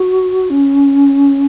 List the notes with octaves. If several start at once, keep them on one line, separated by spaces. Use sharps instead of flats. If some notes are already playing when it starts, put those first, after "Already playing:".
Already playing: F#4
C#4